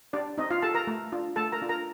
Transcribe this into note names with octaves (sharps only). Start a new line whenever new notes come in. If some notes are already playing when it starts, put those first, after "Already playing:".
D4 G4 D5
C4 D#4 D#5
F4 F5
G4 A4 A5
A#4 A#5
A3
D4 F4
A3 A4 A5
A#4 A#5
D4 F4
A#4 A#5